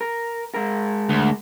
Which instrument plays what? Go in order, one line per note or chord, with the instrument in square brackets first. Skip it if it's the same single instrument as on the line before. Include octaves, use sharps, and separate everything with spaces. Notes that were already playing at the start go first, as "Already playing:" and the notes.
[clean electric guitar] A#4
G#3 A#4
[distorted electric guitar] D2